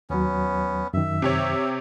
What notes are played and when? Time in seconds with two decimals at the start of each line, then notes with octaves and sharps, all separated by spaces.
0.10 D#2 F#3 B3 C#4
0.94 F#2 D#3 E5
1.22 C3 G4 C#5